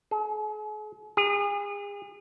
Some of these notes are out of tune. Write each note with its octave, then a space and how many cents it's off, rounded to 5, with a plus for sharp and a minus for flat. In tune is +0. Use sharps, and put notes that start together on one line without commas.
G#4 +45
G#4 -35